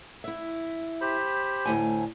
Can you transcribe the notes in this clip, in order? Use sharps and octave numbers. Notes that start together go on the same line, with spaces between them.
E4 E5
G4 C5 B5
D2 A2 G#5